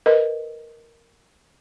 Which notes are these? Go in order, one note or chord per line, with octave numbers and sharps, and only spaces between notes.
A#4 B4 D#5